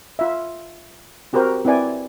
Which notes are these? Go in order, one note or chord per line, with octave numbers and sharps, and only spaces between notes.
F4 E5
C4 F#4 G4 A#4 C5
C4 E4 B4 D5 G#5